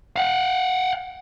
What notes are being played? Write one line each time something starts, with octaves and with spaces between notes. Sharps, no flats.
F5 F#5